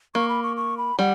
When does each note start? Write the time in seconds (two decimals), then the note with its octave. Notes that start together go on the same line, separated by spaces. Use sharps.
0.15 A#3 C#6
0.29 B5
0.43 C#6
0.57 C#6
0.78 B5
0.99 G3 F#5